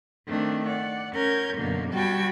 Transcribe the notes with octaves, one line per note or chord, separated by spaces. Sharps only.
D#3 A3 C4 D4
D5 F#5
C#4 A#4 G6 G#6
F#2 B2 D3 A#3
G3 F#4 G5 A5 B5 G#6